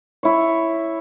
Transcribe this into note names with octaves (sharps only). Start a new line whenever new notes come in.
E4 C#5